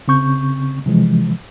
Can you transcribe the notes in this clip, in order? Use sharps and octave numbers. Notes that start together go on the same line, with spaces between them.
C#3 C4 C#6 G6
C3 E3 F3 G#3